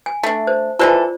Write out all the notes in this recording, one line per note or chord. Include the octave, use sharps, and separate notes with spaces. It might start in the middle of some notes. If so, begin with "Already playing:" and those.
G#5
A3 D4
C5
E3 G#3 F4 A4 C5 D5